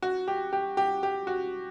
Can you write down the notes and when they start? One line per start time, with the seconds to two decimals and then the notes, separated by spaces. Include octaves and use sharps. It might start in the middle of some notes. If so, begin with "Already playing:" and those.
0.02 F#4
0.28 G4
0.53 G4
0.77 G4
1.03 G4
1.27 F#4